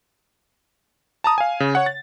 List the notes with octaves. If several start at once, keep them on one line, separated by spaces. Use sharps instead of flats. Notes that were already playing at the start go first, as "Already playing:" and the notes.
A5 A#5 D#6
F5 G#5
C#3
C#5 F#5
A6